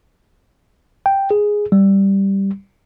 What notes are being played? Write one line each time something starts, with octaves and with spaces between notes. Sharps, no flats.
G5
G#4
G3